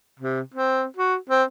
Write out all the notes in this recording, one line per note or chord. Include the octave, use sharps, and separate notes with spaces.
C3
C4
F#4
C4